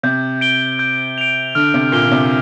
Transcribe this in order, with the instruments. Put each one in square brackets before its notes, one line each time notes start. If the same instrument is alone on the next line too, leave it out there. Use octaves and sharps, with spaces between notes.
[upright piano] C3 [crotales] G6
[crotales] D7 G7
G6
D7 F7
[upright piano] D3 [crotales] F6
[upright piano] C3
[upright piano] A#2 [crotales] D7 G7
[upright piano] D3
C3